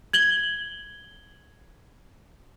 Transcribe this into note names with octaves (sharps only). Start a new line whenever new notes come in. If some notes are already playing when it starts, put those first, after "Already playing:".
G#6 F#7 G7